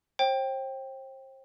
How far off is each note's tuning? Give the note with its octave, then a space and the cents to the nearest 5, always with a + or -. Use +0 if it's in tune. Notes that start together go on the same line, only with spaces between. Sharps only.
C5 +35 G5 +0